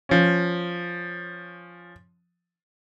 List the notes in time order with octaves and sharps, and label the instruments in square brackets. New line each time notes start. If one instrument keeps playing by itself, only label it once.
[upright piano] F3 C#4